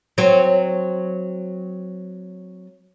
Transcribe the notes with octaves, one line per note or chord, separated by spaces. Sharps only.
F#3 C4